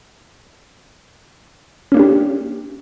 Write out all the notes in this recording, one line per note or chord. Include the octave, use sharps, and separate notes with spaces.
A#3 C#4 D4 G4